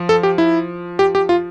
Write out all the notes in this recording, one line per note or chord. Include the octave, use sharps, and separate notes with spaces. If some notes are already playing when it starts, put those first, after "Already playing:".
Already playing: F3
A4
G4
E4
G4
G4
F4